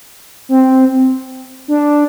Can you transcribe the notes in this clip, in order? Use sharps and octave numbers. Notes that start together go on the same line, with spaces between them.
C4
D4